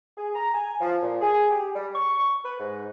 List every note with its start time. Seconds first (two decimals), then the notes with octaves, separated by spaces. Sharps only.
0.17 G#4
0.35 A#5
0.54 G#5
0.81 F3
1.02 A#2
1.21 G#4
1.50 G4
1.75 G3
1.95 C#6
2.45 B4
2.60 G#2